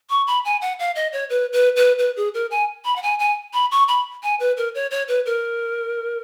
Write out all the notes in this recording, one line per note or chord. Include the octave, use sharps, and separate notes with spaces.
C#6
B5
G#5
F#5
F5
D#5
C#5
B4
B4
B4
B4
G#4
A#4
G#5
B5
F#5
G#5
G#5
B5
C#6
B5
G#5
B4
A#4
C#5
C#5
B4
A#4